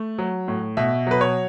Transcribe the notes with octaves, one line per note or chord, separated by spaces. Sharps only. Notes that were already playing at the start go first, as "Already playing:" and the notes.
Already playing: A3
F#3
A2
B2 E5
F#3 B4
C#5